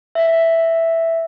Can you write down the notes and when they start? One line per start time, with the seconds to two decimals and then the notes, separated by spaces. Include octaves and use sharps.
0.15 E5